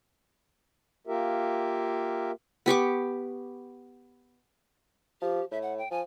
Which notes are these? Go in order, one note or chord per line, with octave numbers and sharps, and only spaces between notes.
A#3 F4 G4 A#4 E5
B3 G4 C#6 D6
F3 G4
A2 E5
F#5
G5
F3 G#5